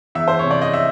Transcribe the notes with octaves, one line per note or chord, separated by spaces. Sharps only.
E2 E5
C5
C3 C#5
D5
D#5
E5